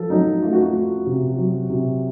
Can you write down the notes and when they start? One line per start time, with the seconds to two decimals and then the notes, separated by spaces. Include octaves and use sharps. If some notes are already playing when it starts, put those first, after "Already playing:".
Already playing: F3 A4
0.10 F#3 D#4
0.42 A3 F4
0.52 F#4
0.63 F4
0.74 F#4
1.06 C3
1.38 F#3
1.69 C3